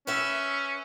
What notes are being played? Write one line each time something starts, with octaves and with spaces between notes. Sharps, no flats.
C#4 B4 E5